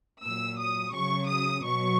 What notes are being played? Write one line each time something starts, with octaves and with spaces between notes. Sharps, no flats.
A#2 F#3 E6
D#6
C#3 F#3 C#6
D#6
B2 F#3 C#6